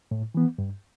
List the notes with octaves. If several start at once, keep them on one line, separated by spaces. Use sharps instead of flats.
A2
E3 B3
G2